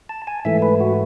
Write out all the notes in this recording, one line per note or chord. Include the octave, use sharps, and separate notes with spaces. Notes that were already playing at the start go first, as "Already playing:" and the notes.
A5
G#5
G#2 E3 A3 E5
B4
F#4